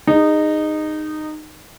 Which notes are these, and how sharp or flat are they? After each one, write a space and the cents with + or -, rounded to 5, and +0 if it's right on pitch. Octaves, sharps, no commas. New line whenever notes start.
D#4 -15 G#4 -25